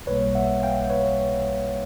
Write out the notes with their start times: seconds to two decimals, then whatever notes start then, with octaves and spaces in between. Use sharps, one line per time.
0.07 B1 B2 G3 A#3 B4 C#5
0.35 E5 F#5
0.63 F5 G5
0.90 B4 C#5